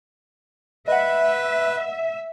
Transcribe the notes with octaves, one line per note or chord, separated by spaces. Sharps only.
B4 D#5 E5 F#5